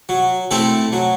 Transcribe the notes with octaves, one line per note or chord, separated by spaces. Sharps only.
F#3
A3 C4 E4 A4
F#3